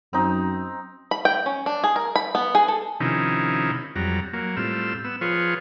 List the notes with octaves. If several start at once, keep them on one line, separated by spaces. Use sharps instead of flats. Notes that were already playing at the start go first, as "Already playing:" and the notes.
F#2 C4 D#4
B5
G5
C#4
D4
G#4
A#4
B5
B3
G#4
A4
C3 D#3 F3 C#4 D#4 E4
F2 F#3 G3 A#5
F#3 A#3
A2 G3 C4 F4 E6
B3 E6
F3 F4 G#4 B4 C#5